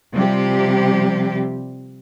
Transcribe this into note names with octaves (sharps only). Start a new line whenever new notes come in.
C3 F3 G3 G4